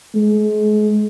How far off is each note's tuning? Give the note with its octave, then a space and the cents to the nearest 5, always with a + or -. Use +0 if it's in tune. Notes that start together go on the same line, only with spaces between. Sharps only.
G#3 +35